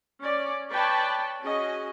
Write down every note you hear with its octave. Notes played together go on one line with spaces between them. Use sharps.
C#4 D5
B4 C#5 D5 G5 A5 B5
C#4 F#4 G#4 D#5